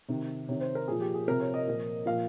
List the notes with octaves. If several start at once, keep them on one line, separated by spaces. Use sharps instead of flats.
C3 D#3
C3 D#3 C#5
C5
A#4
A#2 F3 G#4
G4
G#4
C3 F3 A#4
C#5
D#5
A#2 F3
A#2 F3 F5